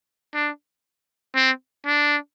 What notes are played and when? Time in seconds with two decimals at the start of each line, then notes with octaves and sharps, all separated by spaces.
0.34 D4
1.35 C4
1.86 D4